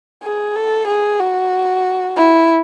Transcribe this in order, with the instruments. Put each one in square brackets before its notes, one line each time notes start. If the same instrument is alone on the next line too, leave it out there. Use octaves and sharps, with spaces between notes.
[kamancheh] G#4
A4
G#4
F#4
E4